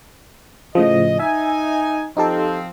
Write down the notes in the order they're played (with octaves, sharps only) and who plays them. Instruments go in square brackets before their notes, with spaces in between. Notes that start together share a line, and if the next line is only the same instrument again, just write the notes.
[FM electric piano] A2 C#3 F3 [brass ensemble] D#5
[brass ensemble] D#4 G#5 [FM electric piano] E5
[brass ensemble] F3 C4 [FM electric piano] D#4 G4 A4